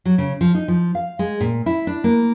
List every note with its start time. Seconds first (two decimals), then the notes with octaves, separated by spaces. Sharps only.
0.05 F#3
0.18 C#3
0.41 F3
0.55 D#4
0.68 F3
0.95 F5
1.19 G#3
1.40 A#2
1.66 E4
1.87 D4
2.04 A#3